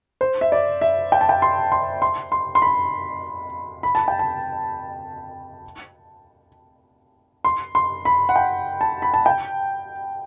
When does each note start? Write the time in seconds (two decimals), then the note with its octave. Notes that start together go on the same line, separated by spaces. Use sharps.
0.21 C5
0.41 E5
0.52 D5
0.81 E5
1.12 G5
1.21 A5
1.29 G5
1.42 C6
1.72 C6
2.02 C6
2.32 C6
2.55 C6
2.62 B5
3.83 B5
3.95 A5
4.08 G5
4.19 A5
7.45 C6
7.75 C6
8.05 B5
8.29 F#5
8.36 G5
8.81 A5
9.02 B5
9.14 A5
9.26 G5